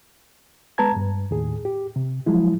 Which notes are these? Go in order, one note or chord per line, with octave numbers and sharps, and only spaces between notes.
G#3 B3 B4 A5 A#5 G#6
G2
D#2 A2 G#4
G4
C3
F3 F#3 G#3 E4